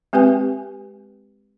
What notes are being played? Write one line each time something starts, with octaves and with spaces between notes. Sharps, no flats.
G#3 C4 G4 B4 G5 G#5